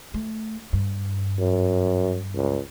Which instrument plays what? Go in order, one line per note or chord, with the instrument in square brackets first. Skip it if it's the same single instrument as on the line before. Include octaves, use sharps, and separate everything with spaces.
[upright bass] A3
G2
[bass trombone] F#2
C#2